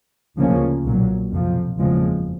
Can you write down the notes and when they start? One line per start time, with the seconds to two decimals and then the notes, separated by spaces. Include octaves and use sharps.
0.37 D2 C#3 F3 A#3 C#4
0.84 B1 A#2 F#3
1.31 F2 C3 F3
1.79 F#1 E2 C#3 F3 G#3